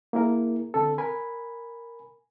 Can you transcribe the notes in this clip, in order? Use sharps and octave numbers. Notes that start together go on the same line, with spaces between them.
A#3 E4 G#4 A#4
D3 C4 A4
A#4 G#5 B5